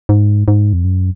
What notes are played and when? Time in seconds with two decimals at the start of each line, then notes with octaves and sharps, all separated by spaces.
0.09 G#2
0.48 G#2
0.73 F2
0.84 F#2